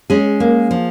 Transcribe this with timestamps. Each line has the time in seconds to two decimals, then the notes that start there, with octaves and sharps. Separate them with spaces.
0.10 G#3 C#4 G#4
0.40 A#3
0.71 F3